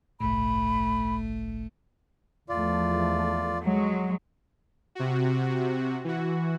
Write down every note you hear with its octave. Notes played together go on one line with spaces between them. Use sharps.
G1 C2 A2 A3 B5
E2 F3 A3 F4 D5
F#3 G#3
C3 F#4
E3 F#4